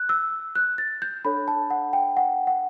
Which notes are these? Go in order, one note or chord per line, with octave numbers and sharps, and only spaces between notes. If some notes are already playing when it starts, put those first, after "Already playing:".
Already playing: F#6
E6
F#6
A6
G6
D4 A4 C#5 B5
A5
F#5
G5
F#5
F#5